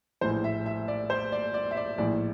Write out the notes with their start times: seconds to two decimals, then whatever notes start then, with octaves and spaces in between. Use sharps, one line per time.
0.21 A#1 A2 E3 C5
0.44 E5
0.66 E5
0.88 D5
1.10 C5
1.32 D5
1.54 D5
1.71 E5
1.77 D5
1.98 A#1 A2 E3 D5